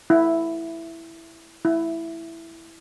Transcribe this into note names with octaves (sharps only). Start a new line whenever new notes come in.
E4
E4